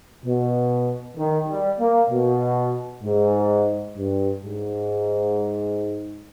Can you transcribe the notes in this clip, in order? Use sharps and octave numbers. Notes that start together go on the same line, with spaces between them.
B2
D#3
G3
A#3
B2
G#2
G2
G#2